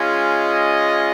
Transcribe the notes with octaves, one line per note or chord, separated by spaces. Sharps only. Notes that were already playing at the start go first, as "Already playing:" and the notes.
Already playing: G#3 C#4 F4
D#5